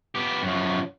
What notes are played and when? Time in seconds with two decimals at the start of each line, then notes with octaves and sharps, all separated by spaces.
0.15 B3 G4
0.43 F#2 F3